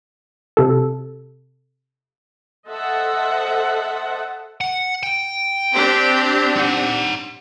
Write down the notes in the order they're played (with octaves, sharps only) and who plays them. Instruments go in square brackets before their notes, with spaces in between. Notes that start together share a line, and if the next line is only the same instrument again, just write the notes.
[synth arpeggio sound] C3 A4
[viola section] A4 C5 D#5 E5 F#5 A5
[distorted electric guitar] F#5
G5
[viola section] C4 D4 G4
[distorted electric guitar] D#4 F#5